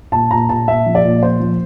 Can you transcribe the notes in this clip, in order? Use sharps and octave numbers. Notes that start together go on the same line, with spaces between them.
A#2 A5
A#2 A#5
A#2 A5
A#2 E5
F3
D5
A#2
F3 C5
F3